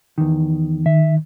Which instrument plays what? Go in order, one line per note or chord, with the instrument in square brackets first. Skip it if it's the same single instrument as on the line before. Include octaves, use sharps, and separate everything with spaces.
[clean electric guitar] E2 D#3
[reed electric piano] D#3 [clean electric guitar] E5